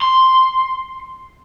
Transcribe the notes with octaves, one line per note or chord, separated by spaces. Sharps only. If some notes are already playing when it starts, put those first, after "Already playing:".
C6